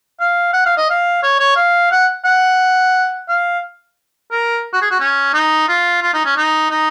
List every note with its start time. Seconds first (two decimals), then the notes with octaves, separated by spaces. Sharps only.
0.20 F5
0.53 F#5
0.66 F5
0.77 D#5
0.90 F5
1.23 C#5
1.39 C#5
1.56 F5
1.91 F#5
2.25 F#5
3.29 F5
4.31 A#4
4.73 F#4
4.82 G#4
4.91 F#4
5.00 C#4
5.34 D#4
5.68 F4
6.02 F4
6.14 D#4
6.25 C#4
6.37 D#4
6.71 D#4